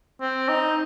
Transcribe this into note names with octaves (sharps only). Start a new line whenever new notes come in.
C4
D#4